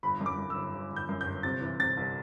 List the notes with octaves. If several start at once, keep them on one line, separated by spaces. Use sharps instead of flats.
G1 B5
F#2
D6
F#2
E6
G1
G1
G1
G6
F#2
G6
G1
C3 A6
E3
C3 A6
C2